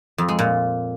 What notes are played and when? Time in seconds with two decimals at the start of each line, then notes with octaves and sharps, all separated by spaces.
0.18 F2
0.29 G#3
0.39 A#2